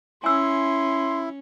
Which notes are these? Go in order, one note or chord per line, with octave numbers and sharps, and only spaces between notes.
C#4 E4 G#5 C6 E6